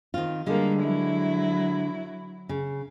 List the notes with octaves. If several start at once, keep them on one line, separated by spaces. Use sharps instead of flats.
D#3 C4 F4
D3 G3 G#3 A#3
F#3 E4
C#3